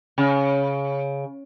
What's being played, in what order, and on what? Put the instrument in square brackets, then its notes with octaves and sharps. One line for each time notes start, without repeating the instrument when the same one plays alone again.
[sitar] C#3